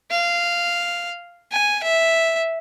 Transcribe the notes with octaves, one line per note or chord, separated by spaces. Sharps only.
F5
G#5
E5